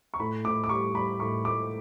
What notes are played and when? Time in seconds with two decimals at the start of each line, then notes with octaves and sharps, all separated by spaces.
0.14 C#6
0.19 A2 B5
0.45 A2 D6
0.64 D6
0.69 G3 C#6
0.95 G3 B5
1.20 A2 C#6
1.45 A2 D6